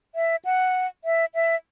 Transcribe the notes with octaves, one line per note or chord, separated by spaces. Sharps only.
E5
F#5
E5
E5